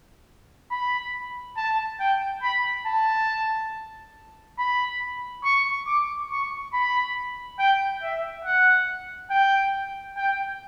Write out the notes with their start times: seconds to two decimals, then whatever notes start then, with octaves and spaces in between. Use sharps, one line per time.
0.71 B5
1.57 A5
2.00 G5
2.42 B5
2.86 A5
4.58 B5
5.44 C#6
5.86 D6
6.30 C#6
6.73 B5
7.59 G5
8.02 E5
8.45 F#5
9.30 G5
10.17 G5